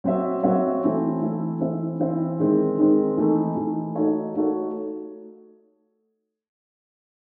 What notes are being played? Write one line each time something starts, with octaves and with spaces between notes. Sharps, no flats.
F#3 C4 F#4 C#5 E5
F#3 C4 F#4 C#5 E5
E3 A3 C4 E4
E3 A3 C4 E4
E3 C4 E4 C5 E5
E3 C4 E4 C5 E5
D#3 G#3 C4
D#3 G#3 C4
E3 A3 D#4
E3 A3 D#4
A3 D#4 F#4 A4 C#5
A3 D#4 F#4 A4 C#5